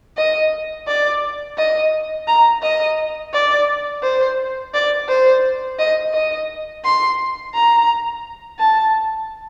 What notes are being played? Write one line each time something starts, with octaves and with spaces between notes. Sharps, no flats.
D#5
D5
D#5
A#5
D#5
D5
C5
D5
C5
D#5
D#5
C6
A#5
A5